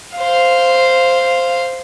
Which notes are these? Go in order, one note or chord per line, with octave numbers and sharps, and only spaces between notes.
C5 F5